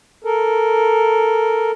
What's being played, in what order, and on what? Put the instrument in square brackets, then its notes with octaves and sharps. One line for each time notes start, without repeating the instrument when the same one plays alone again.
[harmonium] A4 A#4